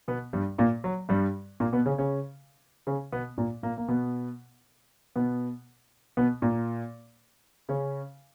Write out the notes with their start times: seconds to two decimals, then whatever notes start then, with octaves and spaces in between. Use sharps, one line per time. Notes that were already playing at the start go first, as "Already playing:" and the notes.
0.08 B2 B3
0.33 G2 G3
0.58 A#2 A#3
0.84 F#3
1.09 G2 G3
1.60 A#2 A#3
1.73 B2 B3
1.86 C#3 C#4
1.98 C#3 C#4
2.87 C#3 C#4
3.12 B2 B3
3.38 A#2 A#3
3.63 A#2 A#3
3.78 A#3
3.88 B2 B3
5.16 B2 B3
6.17 B2 B3
6.42 A#2 A#3
7.69 C#3 C#4